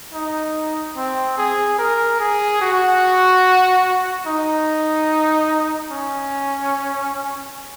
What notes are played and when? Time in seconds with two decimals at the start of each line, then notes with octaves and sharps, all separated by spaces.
0.13 D#4
0.96 C4
1.38 G#4
1.79 A#4
2.20 G#4
2.62 F#4
4.27 D#4
5.91 C#4